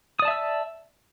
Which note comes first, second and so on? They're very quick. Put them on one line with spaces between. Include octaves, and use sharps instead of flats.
D#6 D5 A5 E5 E6